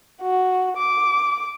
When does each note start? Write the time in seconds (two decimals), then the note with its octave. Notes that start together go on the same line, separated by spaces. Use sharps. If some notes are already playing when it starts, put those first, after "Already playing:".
0.22 F#4
0.77 D6